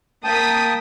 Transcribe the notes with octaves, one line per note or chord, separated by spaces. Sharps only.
A#3 G5 A5 D#6 B6